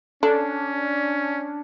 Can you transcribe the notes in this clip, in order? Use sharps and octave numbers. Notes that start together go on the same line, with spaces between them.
C#4 D4 A4